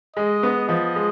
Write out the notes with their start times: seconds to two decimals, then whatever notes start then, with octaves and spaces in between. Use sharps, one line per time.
0.17 G#3 D#5
0.43 B3
0.69 F3 D#5
0.96 G#3